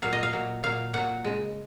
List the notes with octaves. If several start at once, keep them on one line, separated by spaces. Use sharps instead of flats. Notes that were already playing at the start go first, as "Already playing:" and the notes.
A#2 F#3 F5
D#5
F5
A#2 F#3
A#2 F#3 F5
A#2 F#3 F#5
C#3 G#3